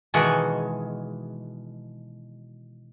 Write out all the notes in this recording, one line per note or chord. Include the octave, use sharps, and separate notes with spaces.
B2 D#3 E3 G#3 F#4